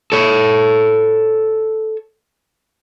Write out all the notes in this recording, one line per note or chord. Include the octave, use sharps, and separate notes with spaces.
A4 C#5